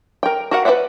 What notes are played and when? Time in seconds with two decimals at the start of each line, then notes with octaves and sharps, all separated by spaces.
0.23 A#4 G5
0.51 F#4 A#4 F#5
0.65 B4 C5 D5 E5 F#5